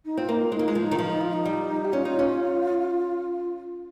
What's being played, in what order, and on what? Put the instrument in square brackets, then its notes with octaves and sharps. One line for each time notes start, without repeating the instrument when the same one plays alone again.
[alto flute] D#4
[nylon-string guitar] C4 [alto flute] F4
[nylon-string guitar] A#3 [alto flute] D#4
[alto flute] F4
[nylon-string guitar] G#3
[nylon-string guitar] A#3 [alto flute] D#4
[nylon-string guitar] G#3 [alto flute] F4
[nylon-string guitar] F3
[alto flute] D#4
[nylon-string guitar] D#3
[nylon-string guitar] F3 [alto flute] F4
[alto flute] D#4
F4
D#4
[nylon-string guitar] G3
[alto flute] G4
[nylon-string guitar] C#4 [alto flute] F4
[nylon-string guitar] D#4
C#4